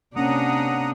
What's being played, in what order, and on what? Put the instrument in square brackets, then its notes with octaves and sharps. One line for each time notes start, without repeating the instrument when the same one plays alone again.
[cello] C3 D4 [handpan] A#3 C#4 [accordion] F#5 A#5 D#6